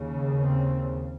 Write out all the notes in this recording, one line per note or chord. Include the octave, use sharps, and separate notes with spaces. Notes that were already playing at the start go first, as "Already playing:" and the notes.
Already playing: D#2 C#3
C4